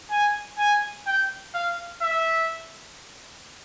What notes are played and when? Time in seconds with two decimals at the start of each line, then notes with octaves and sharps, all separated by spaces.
0.11 G#5
0.58 G#5
1.07 G5
1.54 F5
2.01 E5